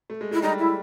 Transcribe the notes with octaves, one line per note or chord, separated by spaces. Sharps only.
A3
G#3
G#3 E4
G3 D#4
E4